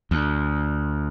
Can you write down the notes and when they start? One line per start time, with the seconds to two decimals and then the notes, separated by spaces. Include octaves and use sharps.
0.11 D2